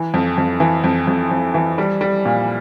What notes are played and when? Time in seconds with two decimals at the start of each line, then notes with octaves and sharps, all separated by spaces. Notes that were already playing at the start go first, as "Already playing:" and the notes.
Already playing: E3
0.14 F2
0.38 F2
0.60 E3
0.84 F2
1.07 F2
1.31 F2
1.54 E3
1.78 G3
2.01 G3
2.25 A#2